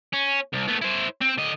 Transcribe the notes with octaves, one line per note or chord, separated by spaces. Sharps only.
C#4
C2
A3 B3
E4 C5
C4
D3 D#5